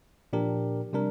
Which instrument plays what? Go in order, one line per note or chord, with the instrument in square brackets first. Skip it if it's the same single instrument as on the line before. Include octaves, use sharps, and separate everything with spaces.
[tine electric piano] A#2 F3 D4 G4 A#4
C3 G3 D4 A#4